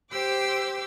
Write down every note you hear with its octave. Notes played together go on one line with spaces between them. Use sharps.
G4 C5 G5 D6 E6